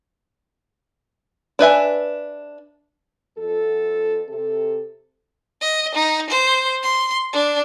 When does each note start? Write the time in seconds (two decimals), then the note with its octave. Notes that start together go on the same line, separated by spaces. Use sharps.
1.59 D4 B4 E5 G#5
3.37 F2 A4
4.28 C3 A4
5.61 D#5
5.95 D#4
6.30 C5
6.83 C6
7.33 D4